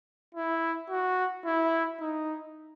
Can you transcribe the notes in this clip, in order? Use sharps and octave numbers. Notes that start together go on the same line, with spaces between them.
E4
F#4
E4
D#4